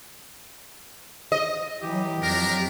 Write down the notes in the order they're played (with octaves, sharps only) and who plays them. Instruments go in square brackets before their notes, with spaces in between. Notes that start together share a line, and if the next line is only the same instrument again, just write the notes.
[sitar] D#5
[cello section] E3 F#3 [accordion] G4
[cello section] F2 F#3 [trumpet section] D4 A#4